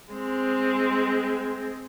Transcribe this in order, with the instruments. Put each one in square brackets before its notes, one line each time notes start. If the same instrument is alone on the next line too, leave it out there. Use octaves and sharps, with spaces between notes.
[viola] G#3 C4